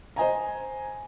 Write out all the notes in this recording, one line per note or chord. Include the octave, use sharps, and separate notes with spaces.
C5 D#5 G#5 A#5